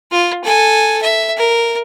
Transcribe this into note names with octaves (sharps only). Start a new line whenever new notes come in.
F4
A4 G#5
E5
A#4